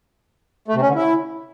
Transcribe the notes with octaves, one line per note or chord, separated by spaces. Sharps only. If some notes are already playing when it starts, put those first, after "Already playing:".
A3
C3
C#4
D3
E4